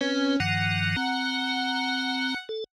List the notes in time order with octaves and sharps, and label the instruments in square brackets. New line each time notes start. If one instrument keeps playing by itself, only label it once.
[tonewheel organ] C4 B4 [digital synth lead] C#4
[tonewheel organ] G2 D#3 F3 [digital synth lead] F#5
[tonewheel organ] C4 A#5
A4